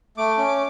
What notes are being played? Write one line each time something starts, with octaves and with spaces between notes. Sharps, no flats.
A3 D6
C#4